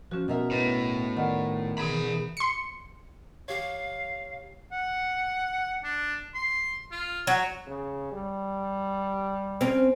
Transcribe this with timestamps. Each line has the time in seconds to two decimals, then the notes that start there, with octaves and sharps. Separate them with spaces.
0.11 F3 C#4 F#4
0.28 B2 A#4 E5
0.51 A2 B3 B4 D#5
1.17 D#3 D5 F#5
1.78 B2 E3 G#4 B5
2.37 C6 C#7
3.48 G4 C#5 F5
4.72 F#5
5.84 D4
6.34 C6
6.91 F4
7.27 F#3 C#5
7.67 C#3
8.12 G3
9.61 C4 C#4